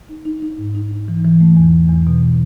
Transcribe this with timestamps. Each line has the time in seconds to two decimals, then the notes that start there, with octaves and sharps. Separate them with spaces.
0.09 D#4
0.25 D#4
0.42 D#4
0.58 G#2
0.75 D#4
0.91 D#4
1.08 E3
1.25 E3
1.40 A3
1.56 E2
1.73 E2
1.89 E2
2.07 B2